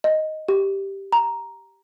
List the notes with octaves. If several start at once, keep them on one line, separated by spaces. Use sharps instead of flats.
D#5
G4
A#5